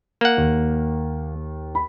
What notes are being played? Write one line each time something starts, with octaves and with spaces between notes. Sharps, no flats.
A#3 F#5
D#2
B5